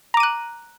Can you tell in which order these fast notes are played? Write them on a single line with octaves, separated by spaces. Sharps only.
A#5 D6 D#7 F#6